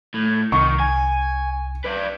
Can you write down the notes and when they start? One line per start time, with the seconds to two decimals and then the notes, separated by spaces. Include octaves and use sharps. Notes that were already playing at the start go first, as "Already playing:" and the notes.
0.14 A2
0.52 C2 D#3 C#6
0.80 G#5
1.85 B4 D5